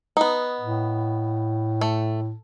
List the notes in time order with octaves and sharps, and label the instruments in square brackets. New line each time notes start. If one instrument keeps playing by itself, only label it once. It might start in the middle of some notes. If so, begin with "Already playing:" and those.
[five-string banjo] B3 D#4
[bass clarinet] A2
[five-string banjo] A3